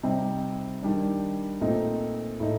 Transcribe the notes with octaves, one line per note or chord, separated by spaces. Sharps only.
C3 G3 C4 D#4
D#3 G3 D4
A#2 A3 C4 D#4
A2 A3 D#4